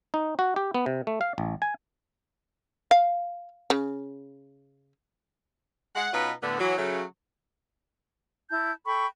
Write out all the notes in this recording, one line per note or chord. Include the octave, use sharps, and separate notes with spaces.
D#4
F#4
G4
B3
C3
A3
F5
A1
G#5
F5
C#3
G#3 F#5
B2 B3 C#4 D#4 F4 B4
A2 D3 B3
E3 F#3
C#3 F#3 A3
E4 A5 G6
A4 G5 B5 C#6